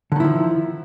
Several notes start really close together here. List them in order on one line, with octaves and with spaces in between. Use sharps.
D3 D#3 E4 F3